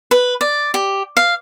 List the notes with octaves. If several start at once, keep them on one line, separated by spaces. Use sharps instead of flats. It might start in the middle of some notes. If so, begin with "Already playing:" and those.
B4
D5
G4
F5